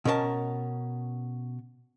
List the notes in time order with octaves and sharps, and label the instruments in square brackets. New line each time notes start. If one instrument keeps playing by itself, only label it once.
[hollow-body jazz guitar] B2 C#4 A#4 C#5 A5